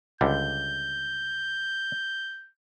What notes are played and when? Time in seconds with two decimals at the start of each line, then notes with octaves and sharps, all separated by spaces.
0.21 C#2 D3 G3 G6